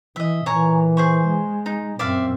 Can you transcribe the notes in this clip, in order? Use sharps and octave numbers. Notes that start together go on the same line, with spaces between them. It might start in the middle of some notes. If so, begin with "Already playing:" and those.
E3 D#5 E5
A#2 E3 C#5 G#5 A#5
G#4 C5 C#6
G#3
D#4
F#2 A#2 C4 D5 E5 F5